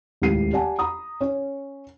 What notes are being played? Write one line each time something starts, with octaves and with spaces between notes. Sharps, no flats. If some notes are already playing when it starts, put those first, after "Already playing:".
D#1 C#2 A2 G4 C7 D#7
G4 D5 F#5 G#5 A5
A#5 B5 D#6
C#4 C#5